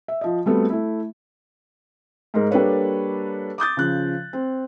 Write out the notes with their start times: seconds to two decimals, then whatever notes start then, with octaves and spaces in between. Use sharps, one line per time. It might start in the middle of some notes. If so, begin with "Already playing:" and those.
0.08 E5
0.21 F3 D#5
0.46 G3 A3 B3 C4 F#4 A4
0.70 A3 E4
2.34 G#2 G#3 A#4
2.51 G3 A#3 D4 A4 B4 C#5
3.58 D6 D#6 G6 A6
3.77 C#3 F3 F#6
4.33 C4